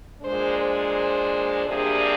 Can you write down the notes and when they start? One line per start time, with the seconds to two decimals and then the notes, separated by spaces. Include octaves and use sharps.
0.22 A#2 G#3 D4 C5
0.58 C5
1.65 F2 C3 G3 A#3 D4 G#4